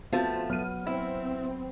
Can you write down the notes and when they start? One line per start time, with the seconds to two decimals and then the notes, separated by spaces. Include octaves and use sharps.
0.13 F3 A3 B3 C4 F4 F#4
0.50 F#3 B3 F6 D#7
0.87 C4 E4